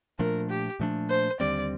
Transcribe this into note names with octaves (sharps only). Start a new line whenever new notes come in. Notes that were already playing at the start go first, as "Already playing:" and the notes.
A#2 F3 A3 D4 A#4
G4
A#2 F3 A3 D4
C5
D#2 D3 G3 C4 D5